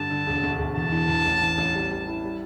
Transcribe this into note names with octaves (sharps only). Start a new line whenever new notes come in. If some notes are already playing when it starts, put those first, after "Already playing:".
Already playing: G2 D3 A5
D3
E1
D2
E1
E2 A5
E3
E2
A1
E3
A1
G3
G3
E4
G3